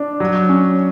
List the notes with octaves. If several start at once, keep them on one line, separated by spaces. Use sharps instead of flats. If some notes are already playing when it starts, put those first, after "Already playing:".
Already playing: D4
F#3
C#4